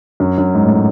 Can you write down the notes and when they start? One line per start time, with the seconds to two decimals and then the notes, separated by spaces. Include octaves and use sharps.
0.20 F#2
0.38 F#2
0.55 G#2
0.65 A2